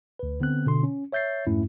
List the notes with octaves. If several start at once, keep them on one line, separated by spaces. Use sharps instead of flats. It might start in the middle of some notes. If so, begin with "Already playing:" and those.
D2 B4
D3 B3 C4 F#6
B2 D3 C6
C#4
C#5 E5 G6 A6 C7
F2 G#2 A3 C#4 E4